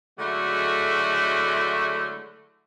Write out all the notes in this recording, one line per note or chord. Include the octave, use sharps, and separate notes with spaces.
D3 F#3 G#3 A3 E4 F#4